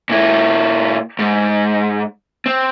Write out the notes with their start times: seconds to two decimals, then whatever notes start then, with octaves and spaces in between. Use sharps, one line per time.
0.10 A#2 E4
1.19 G#2
2.46 C4